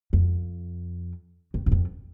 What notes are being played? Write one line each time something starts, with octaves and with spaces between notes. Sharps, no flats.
F2
F2
F#2
F2